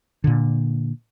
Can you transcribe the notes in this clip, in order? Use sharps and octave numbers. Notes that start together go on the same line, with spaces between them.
A#2 D3